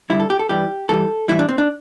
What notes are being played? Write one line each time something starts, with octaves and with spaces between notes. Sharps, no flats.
G2 D3 G3 E4
A4
G4
A4
G2 E3 G3 G4
G2 E3 G3 A4
A2 E3 G3 E4
D4
C4
D4